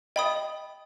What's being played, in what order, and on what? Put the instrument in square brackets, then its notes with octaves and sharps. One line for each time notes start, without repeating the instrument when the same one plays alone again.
[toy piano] D#5 [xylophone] G5 B5 D#6